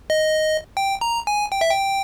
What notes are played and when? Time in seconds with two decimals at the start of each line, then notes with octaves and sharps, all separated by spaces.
0.10 D#5
0.77 G5
1.01 A#5
1.27 G#5
1.52 G5
1.61 E5
1.71 G5